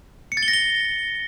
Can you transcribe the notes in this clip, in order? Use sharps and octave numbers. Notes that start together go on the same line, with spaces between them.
C#7
A6
G7
A#6
G7